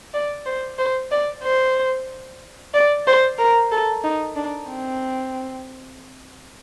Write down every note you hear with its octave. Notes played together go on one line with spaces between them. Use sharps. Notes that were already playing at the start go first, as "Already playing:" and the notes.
D5
C5
C5
D5
C5
D5
C5
A#4
A4
D#4
D4
C4